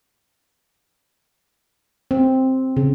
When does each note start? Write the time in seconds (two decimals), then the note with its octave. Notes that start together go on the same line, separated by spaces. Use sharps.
2.11 C4
2.77 C#3